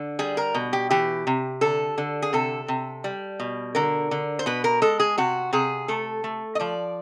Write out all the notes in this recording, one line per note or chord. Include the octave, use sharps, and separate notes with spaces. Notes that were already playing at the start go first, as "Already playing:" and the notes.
Already playing: D3
G3 G#4
A#4
B2
G4
E3 G4
C3
D3 A4
D3
G#4
C3 A4
C3
G3
B2
D3 A#4
D3
C5
B2 B4
A#4
G#3 A4
G#4
C3 F#4
C3 G#4
A3 A4
A3
D#5
F3 D5